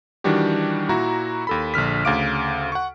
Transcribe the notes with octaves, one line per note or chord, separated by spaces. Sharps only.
D#3 E3 G3 D4 F#4 G4
A#2 E4 F#4 A#5
D#2 A4 B5
A#1 D3 F6 B6
D2 C#3 F5 D6 D7
F#5 C#6